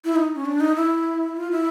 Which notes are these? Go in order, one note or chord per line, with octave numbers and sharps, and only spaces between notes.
E4
D#4
C#4
D4
D#4
E4
F4
E4